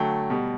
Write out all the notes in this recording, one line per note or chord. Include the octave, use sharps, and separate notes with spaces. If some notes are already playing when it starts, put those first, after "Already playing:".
Already playing: D3 F#3 A3 G5
B2 G3